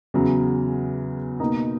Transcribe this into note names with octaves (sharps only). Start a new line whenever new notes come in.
E2 C#3 F#3
B2 A#3 D#4